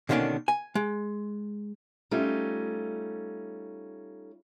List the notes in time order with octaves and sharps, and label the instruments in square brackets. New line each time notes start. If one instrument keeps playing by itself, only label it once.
[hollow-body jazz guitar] B2 D3 D#3 A#3 C#4 D4
G#5
G#3
[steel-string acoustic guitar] G3 A3 C#4 D#4 F4